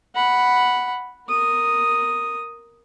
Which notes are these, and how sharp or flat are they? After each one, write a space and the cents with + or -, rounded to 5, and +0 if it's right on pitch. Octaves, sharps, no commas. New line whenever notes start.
F#5 +0 B5 +0
A#4 +0 D#6 +0